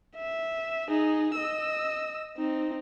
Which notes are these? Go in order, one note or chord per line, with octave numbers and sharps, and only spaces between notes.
E5
D#4 G#4
D#5 E6
C4 D#4